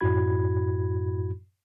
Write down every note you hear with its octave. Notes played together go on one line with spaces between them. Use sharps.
F#2 A2 E4 F#4 B5 G#6